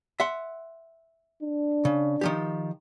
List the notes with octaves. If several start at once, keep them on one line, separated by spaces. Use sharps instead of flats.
E5 F#5 C6
D4
C#3
D#3 F3 G4